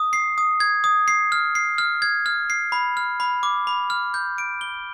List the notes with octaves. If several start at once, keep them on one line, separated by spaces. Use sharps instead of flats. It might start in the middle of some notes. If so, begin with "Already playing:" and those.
Already playing: D#6
C7
D#6
G#6
D#6
C7
F6
C7
F6
G#6
F6
C7
B5
F6
B5
D6
B5
F6
G6
D7
G7